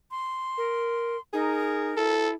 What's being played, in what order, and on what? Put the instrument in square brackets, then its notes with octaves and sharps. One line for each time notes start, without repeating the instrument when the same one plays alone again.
[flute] C6
[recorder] A#4
[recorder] D#4 [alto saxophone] G#4 [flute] A#4
[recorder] E4 [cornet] A4